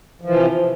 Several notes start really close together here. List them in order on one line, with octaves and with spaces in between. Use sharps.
F3 E3 C3